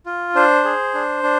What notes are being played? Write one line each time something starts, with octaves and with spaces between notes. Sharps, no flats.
F4
D4 C5
G#4
D4
D4